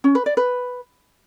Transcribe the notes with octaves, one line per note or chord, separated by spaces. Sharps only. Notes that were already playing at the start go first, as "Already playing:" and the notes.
C#4
B4
D5
B4